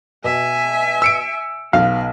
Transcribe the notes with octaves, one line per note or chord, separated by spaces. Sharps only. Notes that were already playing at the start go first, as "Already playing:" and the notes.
B2 E5 G#5
E6 C#7 D7
B1 B3 F5